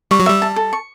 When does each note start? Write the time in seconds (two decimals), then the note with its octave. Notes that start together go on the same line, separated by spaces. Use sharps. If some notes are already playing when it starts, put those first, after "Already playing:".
0.11 G3 C#6
0.20 F#3
0.26 G3 E5
0.42 A5
0.56 A4
0.73 C#6